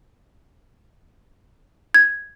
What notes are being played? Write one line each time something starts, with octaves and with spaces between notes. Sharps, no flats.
G#6